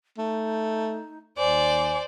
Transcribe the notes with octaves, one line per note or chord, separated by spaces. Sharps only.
A3 D#4
D#2 C5 D5 G#5